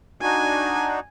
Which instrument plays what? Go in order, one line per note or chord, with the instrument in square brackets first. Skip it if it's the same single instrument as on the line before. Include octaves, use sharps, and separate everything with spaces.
[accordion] D4 D#4 F#4 [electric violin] G#5